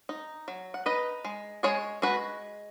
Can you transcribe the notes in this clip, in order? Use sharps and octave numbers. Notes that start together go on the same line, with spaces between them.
D#4
F#3
F#5
D#4 B4 D#5
G#3
G#3 G#4 C#5
G#3 F#4 B4